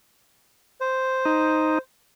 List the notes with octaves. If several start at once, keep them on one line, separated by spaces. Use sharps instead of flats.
C5
D#4